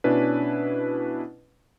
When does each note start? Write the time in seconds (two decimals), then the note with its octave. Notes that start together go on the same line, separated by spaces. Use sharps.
0.04 B2 C#4 D4 E4 B4